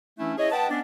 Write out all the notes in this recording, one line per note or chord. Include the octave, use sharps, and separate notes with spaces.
E3 A3 C#4 D4 E4
E4 G#4 C#5 D#5
B4 D#5 F#5 G5 A5
B3 C#4 D4